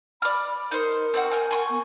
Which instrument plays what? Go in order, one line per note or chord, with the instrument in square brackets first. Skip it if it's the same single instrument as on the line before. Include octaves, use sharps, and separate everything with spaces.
[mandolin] D5 F6 [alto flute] B5
[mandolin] D#4 C5 [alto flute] A#4
[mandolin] C4 E4 F#4
G#5 F6 G6
G#5 C6 C#6
[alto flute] B3